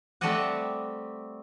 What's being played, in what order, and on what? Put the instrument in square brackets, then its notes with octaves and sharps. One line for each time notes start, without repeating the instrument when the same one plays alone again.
[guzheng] G3 A3 C4 D5 D#5 F#5